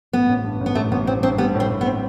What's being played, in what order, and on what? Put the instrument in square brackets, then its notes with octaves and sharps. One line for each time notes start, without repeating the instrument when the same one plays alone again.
[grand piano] A1 [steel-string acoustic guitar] B3
[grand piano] A1
G2
A1
[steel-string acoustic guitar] B3
[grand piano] A1 [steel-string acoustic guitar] A3
[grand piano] A1 [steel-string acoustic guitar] B3
[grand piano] A1 [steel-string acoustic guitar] C4
[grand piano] G2 [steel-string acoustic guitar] C4
[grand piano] G3 [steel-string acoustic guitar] B3
[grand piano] A2
[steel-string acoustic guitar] C4
[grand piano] A2
[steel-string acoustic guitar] B3
[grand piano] C4